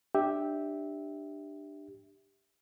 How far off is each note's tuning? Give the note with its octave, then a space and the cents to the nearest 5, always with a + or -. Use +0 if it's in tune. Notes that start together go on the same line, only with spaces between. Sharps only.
D4 +20 G4 +0 E5 -10